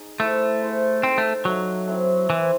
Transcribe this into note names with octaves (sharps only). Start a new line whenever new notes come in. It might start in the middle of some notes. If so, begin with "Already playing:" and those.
Already playing: D#4 G#4 D#5
A3 E4 A4 C5
E4 G#4 C5
G#3 C4 D#4 A4 C5
A3
F#3 A3 D#4 F#4
A3 C4 E4
E3 E4 C5 E5